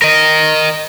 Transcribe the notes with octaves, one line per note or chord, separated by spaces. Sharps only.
A#4 D#5